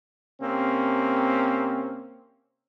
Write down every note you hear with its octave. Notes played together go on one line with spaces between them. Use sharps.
C3 A#3 C4 C#4